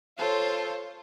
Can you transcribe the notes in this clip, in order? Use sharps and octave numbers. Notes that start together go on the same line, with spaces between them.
F4 A4 C5 C#5